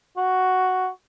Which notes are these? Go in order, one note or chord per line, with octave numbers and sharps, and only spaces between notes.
F#4